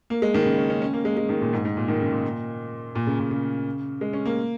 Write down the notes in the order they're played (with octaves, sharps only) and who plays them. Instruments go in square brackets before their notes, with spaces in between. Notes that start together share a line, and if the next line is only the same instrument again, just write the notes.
[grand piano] A#3
G#3
D#3
C#3
C#4
C#4
C#4
A#3
G#3
G#3
D#3
A#2
G#2
G#2
A#2
D#3
C#3
A#2
A#2
C#3
A#2
C#3
G#3
C#4
A#3